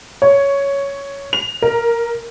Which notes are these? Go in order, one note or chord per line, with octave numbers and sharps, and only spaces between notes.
C#5
F7
A#4